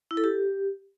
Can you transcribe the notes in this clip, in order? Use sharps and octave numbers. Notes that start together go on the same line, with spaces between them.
E4
A4
G4